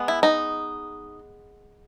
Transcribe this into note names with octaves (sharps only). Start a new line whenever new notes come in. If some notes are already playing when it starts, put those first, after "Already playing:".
Already playing: G#3 B3
E4
D#4